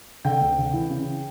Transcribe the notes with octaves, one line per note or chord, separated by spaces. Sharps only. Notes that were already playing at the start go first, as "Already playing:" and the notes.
D3 G5
D2
D3
E3
C#3